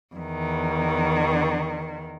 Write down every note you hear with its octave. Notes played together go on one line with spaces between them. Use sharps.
E2 D#3